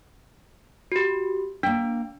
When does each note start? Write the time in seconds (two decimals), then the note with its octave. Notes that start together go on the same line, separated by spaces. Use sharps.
0.92 F#4 G4
1.63 A#3 D4 G5